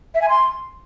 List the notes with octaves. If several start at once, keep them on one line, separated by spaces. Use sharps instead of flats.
E5
G#5
C6